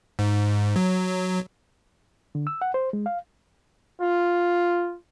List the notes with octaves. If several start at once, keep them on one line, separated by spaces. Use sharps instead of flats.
G#2
F#3
D3
E6
F#5
C5
G#3
F5
F4